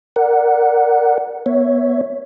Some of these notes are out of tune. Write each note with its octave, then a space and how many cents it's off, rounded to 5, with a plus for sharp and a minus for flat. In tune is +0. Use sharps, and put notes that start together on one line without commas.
A#4 +0 D5 +0 F#5 +0
B3 -15 C#5 +0 E5 +0